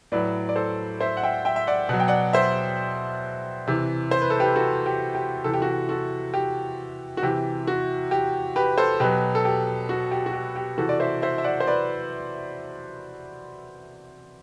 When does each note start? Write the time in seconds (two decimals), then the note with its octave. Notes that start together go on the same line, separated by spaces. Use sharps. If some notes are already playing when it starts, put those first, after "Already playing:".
0.12 A2 F#3 B4 D5
0.49 D5
0.56 A4 C5
1.01 C5 E5
1.17 F#5
1.23 E5 G5
1.45 E5 G5
1.56 E5
1.67 D5 F#5
1.89 B2 F#3 F#5
2.00 G5
2.08 D5 F#5
2.33 C5 E5
3.67 C3 E3
4.11 C5
4.22 B4
4.30 A4
4.40 G4 B4
4.55 F#4 A4
4.86 G4
5.15 G4
5.44 C3 E3 A4
5.54 G4
5.62 F#4
5.71 G4
5.89 F#4 A4
6.34 G4
7.17 F#4
7.22 C3 E3 G4
7.67 F#4
8.11 G4
8.56 G4 B4
8.78 A4 C5
9.00 B2 F#3 G4 B4
9.35 A4
9.45 G4
9.89 F#4
10.11 G4
10.26 F#4
10.33 G4
10.56 G4
10.78 C3 E3 F#4 A4
10.89 D5
11.00 C5 E5
11.22 C5 E5
11.38 E5
11.44 D5 F#5
11.60 C5
11.67 B4 D5